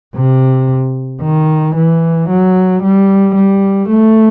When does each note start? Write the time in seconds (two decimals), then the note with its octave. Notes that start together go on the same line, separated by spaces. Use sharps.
0.16 C3
1.22 D#3
1.76 E3
2.29 F#3
2.83 G3
3.35 G3
3.89 A3